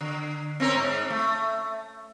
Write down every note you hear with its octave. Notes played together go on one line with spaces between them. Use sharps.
D3
C4 C#4 A#4
G#2
A3